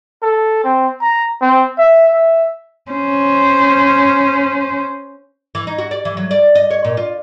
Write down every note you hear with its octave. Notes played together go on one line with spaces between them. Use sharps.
A4
C4
A#5
C4
E5
E5
C#4 C5
E3
D#4
F#4
D5
E3
F#3
D5
D#5
C#5
A#2
F4